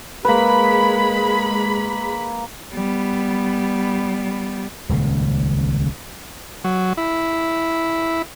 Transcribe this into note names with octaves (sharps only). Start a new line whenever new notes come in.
G#3 A#3 B4 B5
G3 B3
D#1 C#2 C#3
F#3
E4